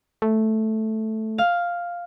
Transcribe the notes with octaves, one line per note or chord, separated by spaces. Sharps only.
A3
F5